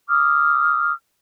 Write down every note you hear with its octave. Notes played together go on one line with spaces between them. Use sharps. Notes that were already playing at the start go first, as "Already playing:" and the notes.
D6 D#6 F6